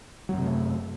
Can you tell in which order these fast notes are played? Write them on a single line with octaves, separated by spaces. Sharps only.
F#3 F#2 C3 A3